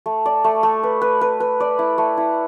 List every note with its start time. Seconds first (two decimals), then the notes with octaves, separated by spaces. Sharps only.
0.06 A3
0.26 D5
0.44 A3
0.63 A3
0.83 B4
1.02 B4
1.21 B4
1.40 B4
1.60 D5
1.79 E4
1.98 A3
2.17 E4